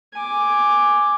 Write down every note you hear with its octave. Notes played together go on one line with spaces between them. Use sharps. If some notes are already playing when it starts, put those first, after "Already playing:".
G#5 D6